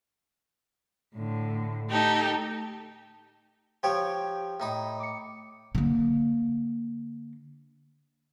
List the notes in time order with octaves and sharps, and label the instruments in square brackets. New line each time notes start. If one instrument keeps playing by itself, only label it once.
[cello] A2 D3
[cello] A3 [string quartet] D#4 G4 A4
[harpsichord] F3 G4 C#5 [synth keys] G5
[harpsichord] A2 D#4 B5
[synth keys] D6 C#7
[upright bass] D3 A#3